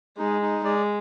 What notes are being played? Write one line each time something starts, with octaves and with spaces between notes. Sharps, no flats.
G#3 D#4
D#4
G#3 D5